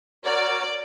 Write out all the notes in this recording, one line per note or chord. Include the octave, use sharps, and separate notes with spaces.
F#4 A#4 C#5 D5